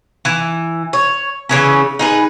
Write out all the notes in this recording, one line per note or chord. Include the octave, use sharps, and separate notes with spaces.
E3
C#5
C#3 E3 C#4
D#4 G#4 B4